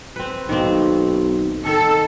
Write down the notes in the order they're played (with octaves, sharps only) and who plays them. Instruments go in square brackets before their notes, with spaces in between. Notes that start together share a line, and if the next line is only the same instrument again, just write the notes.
[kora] C4 B4
[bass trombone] B1 [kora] D#3 A#3 C4
[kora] D#3 [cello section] A4